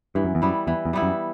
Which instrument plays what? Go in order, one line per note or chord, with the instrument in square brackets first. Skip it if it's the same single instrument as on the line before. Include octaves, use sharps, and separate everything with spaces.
[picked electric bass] G2 [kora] E3
[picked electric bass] F#2
E2
[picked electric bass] F#2 [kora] G3 B3 E4
[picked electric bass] E2 [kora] E3
[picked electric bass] E2
[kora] G3 B3 E4
[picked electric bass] F#2